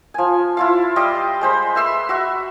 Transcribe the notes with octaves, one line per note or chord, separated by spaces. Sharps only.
F3 G#5
E4 F4 F5
G3 D#5 C6 D6
G#3 C5 B5
B4 E5 C6 E6
F#4 E5 B5